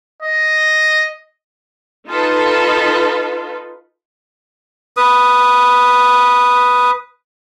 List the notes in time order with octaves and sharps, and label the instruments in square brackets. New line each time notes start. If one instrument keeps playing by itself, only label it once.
[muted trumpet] D#5
[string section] D#4 F4 A4 B4
[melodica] B4 D#6